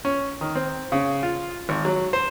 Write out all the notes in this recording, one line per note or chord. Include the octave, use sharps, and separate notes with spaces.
C#4
D#3
C4
C#3
F4
G#1
F#3
C5